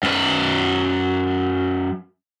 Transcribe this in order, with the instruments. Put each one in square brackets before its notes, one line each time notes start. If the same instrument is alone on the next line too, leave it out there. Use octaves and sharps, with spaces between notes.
[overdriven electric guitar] F#2 B4